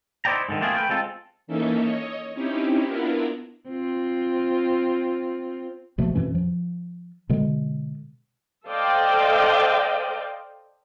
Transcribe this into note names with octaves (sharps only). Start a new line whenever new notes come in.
D#4 E4 C5 D5 G5 A#5
G#2 D3 D#3
A3 A#3 C4 F4 F#4 G#4
A3 B4 G5
G#3 C4 F4 A4
E3 A#3 C#4 D#4 A4 E5
C#5 D#5
C4 C#4 D#4 E4 G4
B3 D4 E4 F4 A#4
C4 F4
A#1 B2 F3 A3
F2 B2 E3 C#4
F3
B2 D3 G#3
A4 C5 D5 D#5 F5 G5